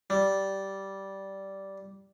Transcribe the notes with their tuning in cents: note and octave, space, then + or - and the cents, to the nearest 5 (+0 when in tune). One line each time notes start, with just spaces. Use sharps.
G3 -10